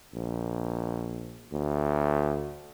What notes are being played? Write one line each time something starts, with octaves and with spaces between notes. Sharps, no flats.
A#1
D2